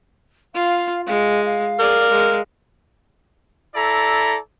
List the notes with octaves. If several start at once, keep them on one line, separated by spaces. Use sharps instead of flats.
F4 F5
G#3 F5
F5
G#4 A#4 D5
G#3
E4 A4 D5 A#5